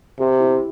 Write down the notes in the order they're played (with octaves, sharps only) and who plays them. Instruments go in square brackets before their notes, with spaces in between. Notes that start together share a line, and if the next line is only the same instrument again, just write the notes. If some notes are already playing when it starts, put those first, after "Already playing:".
[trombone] C3 [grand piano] G4
[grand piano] E4